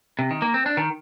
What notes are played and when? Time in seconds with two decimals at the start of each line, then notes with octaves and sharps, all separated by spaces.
0.19 C3
0.31 D#3
0.42 A#3
0.54 C4
0.66 D4
0.77 D#3